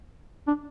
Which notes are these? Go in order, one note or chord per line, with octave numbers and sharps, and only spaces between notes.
D4